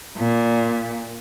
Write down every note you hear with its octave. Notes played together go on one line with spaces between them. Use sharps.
A#2